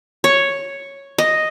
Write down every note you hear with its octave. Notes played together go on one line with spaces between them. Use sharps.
C#5
D#5